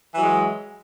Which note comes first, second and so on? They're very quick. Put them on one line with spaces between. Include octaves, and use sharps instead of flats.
E3 F#3 G#3